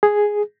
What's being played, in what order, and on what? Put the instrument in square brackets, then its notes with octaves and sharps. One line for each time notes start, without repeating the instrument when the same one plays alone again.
[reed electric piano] G#4